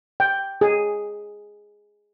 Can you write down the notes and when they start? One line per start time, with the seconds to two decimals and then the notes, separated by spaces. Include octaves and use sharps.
0.20 G5
0.61 G#4